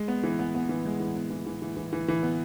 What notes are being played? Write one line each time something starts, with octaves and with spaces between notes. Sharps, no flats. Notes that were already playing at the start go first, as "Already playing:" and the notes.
Already playing: G#3
B3
E3
B3
B3
E3
G#3
E3
B3
E3
E3
E3
E3
E3
E3
B3